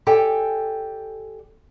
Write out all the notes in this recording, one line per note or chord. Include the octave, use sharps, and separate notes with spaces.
G4 A4 D5 G5 G#5